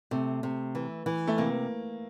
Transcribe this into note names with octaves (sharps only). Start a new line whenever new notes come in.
C3 A3
C3
E3
E3
A3
C3 A#3